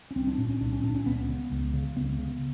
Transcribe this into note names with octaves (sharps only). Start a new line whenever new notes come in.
C#4
C2 C4
D4
A#2 C#4
C#4
C2 D4
C#4
A#2 D4
C#4
C#2 B3
C#3
C#2
C#3
C#2 B3
C#3